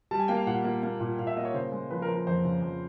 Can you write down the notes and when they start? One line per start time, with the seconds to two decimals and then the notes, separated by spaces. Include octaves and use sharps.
0.11 G3 A5
0.19 G#5
0.28 A#3 G5
0.37 F5
0.47 A#2 F#5
0.64 A#3
0.83 A#3
1.00 A#2
1.19 A#2 F5
1.27 E5
1.37 A#3 D#5
1.45 C#5
1.54 C#3 C5
1.72 G#3
1.91 F3 B4
2.02 A#4
2.08 F3
2.14 A#4
2.27 F2 C5
2.45 C#3
2.62 F2